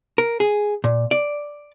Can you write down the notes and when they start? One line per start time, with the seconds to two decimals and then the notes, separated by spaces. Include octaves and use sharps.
0.18 A#4
0.40 G#4
0.84 A#2
1.11 D5